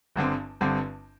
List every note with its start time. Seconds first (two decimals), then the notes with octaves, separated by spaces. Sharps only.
0.16 G1 G2 D3 C4
0.61 G1 G2 D3 C4